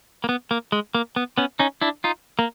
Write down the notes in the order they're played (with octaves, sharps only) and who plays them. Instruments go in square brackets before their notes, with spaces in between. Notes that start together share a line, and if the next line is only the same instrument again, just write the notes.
[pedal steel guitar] A#3
B3
A#3
G#3
A#3
B3
B3 C#4
C#4 D#4
D4 E4
D#4 F4
A#3